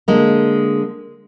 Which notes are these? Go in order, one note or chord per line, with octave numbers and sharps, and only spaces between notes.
D3 G#3 A#3